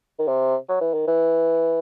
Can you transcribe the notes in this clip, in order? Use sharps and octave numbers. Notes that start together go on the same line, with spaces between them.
D#3
C3
F#3
E3
D#3
E3